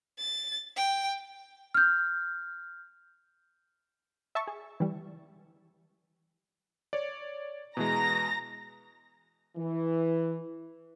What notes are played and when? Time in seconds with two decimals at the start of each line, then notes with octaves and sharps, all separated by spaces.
0.19 A6
0.76 G5
1.74 F6 G6
4.35 E5 A5 C#6
4.47 G#4
4.80 E3 G3
6.93 C#5 D5
7.77 B2 E3 G#3 A#5 A#6
9.56 E3